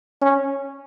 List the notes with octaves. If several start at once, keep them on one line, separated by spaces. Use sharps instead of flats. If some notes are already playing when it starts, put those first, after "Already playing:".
C#4